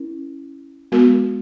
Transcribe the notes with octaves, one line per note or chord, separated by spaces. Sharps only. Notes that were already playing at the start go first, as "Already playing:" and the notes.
Already playing: C#4 E4 A#4
G#3 B3 F#4 A#4